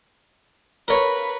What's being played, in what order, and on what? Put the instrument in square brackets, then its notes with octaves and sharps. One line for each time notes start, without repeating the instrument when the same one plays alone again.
[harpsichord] A#4 C#5 [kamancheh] B4